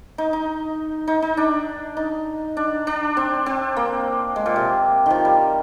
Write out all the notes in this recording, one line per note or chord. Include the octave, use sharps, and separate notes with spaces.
D#4
D#4
D#4
D#4
D4
D#4
D4
D4
C4
C4
A#3
G#3
A#2
C3
D#3 F3
G3